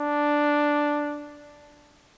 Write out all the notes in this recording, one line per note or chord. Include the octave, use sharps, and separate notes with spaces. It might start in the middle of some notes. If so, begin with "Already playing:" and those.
Already playing: D4